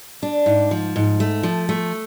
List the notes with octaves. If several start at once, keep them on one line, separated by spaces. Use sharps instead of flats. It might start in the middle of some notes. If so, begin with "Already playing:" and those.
D4
G#2
F3
G#2
A3
F3
A3